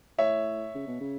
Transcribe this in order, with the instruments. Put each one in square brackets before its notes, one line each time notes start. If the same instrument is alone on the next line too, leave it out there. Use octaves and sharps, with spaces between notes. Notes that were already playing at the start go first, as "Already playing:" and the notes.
[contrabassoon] A2 [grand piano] C#5 E5
[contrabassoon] C#3
B2
C#3